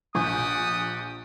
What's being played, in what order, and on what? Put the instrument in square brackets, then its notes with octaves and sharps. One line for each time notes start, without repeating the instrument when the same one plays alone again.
[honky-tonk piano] A#1 G#5 C#6 [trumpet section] G4 F#5 A5 [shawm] D#6